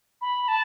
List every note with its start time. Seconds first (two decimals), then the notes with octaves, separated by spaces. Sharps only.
0.21 B5
0.48 A5